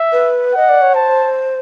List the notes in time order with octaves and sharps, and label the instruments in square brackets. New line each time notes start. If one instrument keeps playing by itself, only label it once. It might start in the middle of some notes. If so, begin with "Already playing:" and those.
Already playing: [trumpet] E5
[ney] B4
[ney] D#5 [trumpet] F#5
[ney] D5
C#5
[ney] C5 [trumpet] A5